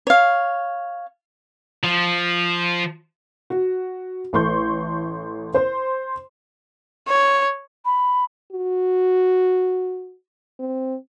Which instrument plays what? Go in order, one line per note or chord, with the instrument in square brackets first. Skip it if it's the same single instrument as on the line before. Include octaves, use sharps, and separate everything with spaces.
[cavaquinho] C#5 F5
[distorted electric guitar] F3
[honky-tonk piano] F#4
A1 A3 C6 C#6 G6
C5 C6
[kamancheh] C#5
[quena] B5
[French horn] F#4
C4